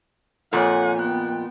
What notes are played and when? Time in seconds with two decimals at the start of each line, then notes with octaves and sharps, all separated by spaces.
0.53 F2 A#2 A4 C#5 F#5 G#5
0.99 B3 G5 F#6